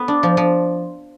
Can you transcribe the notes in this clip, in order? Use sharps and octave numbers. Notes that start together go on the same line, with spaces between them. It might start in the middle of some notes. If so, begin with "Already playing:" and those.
Already playing: B3 B5
D4
F3
F3